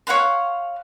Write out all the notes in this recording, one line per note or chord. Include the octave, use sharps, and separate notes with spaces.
C#5 F5 F#5 C6